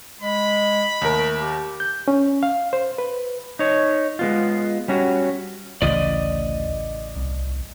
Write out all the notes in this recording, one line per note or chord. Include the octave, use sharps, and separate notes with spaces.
G#3 B5
D#2 A3 A#4
G4
G6
C#4
F5
C5
B4
D#4 C#5
G#3 B3 F4
G3 C#4 F#4
A1 D2 C#3 E3 D5 D#5
C2